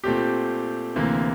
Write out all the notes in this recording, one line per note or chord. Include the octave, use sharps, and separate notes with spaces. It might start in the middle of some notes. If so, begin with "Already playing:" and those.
A#2 A3 C4 G4
D2 C3 E3 A#3